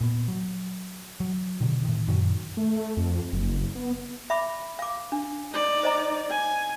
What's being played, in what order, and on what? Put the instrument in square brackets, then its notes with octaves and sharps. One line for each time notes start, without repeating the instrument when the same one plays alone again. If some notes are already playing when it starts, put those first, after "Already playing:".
[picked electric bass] A#2 B3
F#3
F#3
B2 D3 D#3
A2 D#3
F#2 A#2 D#3 F#3
[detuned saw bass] A3
F2
F#1
B3
[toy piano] E5 B5 D6
F5 D6
D4
[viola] D#4 D5
[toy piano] C5 D#5 A#5
[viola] G#5